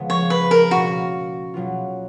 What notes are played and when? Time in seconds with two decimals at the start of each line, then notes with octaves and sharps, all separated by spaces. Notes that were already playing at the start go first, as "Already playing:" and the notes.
Already playing: C#3 F3 G#3 B3
0.10 C#5
0.30 B4
0.51 A#4
0.71 B2 A#3 C#4 F#4
1.54 B2 F#3 B3 F4